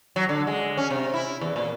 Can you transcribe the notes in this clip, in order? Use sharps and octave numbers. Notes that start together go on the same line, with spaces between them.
F#3
D3
G#3
C#4
C3
E4
E2
A#2